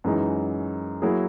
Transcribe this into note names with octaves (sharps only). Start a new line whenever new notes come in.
F#2 E3 G#3 D#4
F#3 A#3 E4 G#4